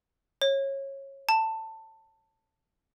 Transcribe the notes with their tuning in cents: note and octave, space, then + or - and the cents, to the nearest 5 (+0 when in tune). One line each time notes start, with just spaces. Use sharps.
C#5 -20
A5 +15